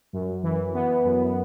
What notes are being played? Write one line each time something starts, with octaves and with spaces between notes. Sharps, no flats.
F#2
E3
B3
F#2